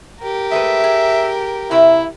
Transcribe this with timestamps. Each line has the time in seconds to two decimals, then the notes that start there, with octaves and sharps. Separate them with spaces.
0.20 G4 A#4
0.51 G#3 A3 B4 E5
0.84 G#4
1.71 C3 E4 E5